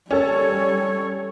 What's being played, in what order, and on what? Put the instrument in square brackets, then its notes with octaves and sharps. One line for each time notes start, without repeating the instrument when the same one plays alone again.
[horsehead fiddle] G3 C#5 [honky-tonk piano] C#4 A4